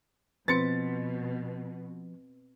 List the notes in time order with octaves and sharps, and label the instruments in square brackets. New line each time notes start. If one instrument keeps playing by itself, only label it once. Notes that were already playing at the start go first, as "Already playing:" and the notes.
[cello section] B2 [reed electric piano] F3 [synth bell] C4 B4 [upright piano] A6 C#7